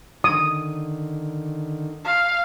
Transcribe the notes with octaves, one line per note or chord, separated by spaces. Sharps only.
D3 D#3 D#6
F5